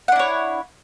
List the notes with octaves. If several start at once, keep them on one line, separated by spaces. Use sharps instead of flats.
D4 E4 C#5 F#5